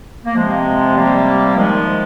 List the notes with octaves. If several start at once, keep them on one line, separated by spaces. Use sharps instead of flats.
A#3
C3 F3 G#3
G3 A#3
D#3 F3 G#3